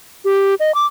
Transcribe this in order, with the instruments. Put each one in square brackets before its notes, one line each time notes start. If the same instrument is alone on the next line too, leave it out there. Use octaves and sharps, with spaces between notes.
[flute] G4
D#5
D6